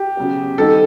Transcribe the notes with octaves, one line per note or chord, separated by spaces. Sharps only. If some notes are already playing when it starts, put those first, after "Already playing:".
Already playing: G4
C#3 F#3 B3
D#3 G3 C4 D#4 F#4 A4